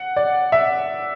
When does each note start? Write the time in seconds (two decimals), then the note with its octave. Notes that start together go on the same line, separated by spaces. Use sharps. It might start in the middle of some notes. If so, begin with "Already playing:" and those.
Already playing: F#5
0.16 D5
0.52 E5